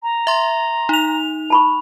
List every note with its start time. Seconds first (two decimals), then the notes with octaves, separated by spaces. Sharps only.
0.03 A#5
0.27 E5 C6
0.89 D#4 F7
1.50 A5 B5 C#6